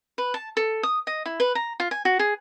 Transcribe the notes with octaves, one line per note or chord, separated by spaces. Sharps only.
B4
A5
A4
D#6
D#5
E4
B4
A#5
F4
G#5
F#4
G#4